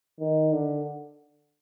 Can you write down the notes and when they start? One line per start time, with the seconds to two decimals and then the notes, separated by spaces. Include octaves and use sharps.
0.20 D#3
0.52 D3